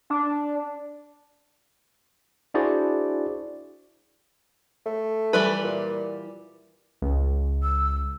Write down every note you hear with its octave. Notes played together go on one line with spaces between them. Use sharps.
D4
D4 E4 F#4 G#4 C5 D5
A3
E3 G3 B4
A#2
C#2
E6